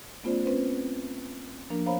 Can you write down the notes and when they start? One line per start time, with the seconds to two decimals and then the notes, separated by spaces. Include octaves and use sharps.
0.24 A3 B3 C#4 F4 C5 D5
0.45 C4 C#4 B4 C5
1.70 F3 A#3 D4 A#4
1.86 B3 C5 C#5 F5 A#5 B5